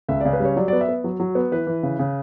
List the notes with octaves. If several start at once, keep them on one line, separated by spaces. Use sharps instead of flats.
C#2 E5
C#3 D5
B4
G3
C#5
F#3 D5
B3 D5
E5
B3
F#3
F#3
B3
E3 B4
E3
C#3
C#3